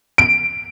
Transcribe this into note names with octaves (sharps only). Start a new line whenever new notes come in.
D7